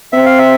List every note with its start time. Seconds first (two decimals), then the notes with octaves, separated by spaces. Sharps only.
0.13 C4 E5
0.26 F5
0.38 E5